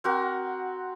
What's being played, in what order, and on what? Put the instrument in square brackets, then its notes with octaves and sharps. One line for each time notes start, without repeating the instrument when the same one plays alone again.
[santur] C4 F#4 A#4 F#5